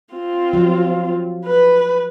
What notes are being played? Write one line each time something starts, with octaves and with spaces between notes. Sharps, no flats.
C4 F4
F3 F#3
B4